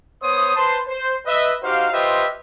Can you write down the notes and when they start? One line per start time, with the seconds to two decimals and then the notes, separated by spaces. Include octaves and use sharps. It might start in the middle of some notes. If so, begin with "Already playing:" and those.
0.23 B3 C5 C#5 D#6
0.56 B4 C5 A5 C6
0.88 C5
1.26 B4 D#5 E5
1.63 D#4 F#4 G4 C5 F5
1.93 F4 G4 B4 C5 D#5 E5